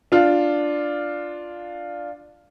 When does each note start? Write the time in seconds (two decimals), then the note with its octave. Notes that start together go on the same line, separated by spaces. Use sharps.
0.12 D4 F4